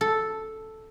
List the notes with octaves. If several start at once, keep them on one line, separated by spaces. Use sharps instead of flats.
A4